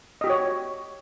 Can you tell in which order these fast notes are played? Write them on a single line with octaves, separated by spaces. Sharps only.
D#5 G4 F#4 C#5